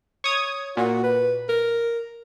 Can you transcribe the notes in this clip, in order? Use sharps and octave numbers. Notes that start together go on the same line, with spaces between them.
C#5 D#6 G#6
A#2 F#4
B4
A#4